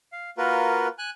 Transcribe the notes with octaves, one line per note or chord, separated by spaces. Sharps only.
F5
A#3 F4 F#4 A#4 B4
G#5 F#6